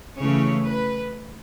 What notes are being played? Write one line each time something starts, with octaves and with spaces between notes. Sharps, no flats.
C#3 E3 A3 C#5
B4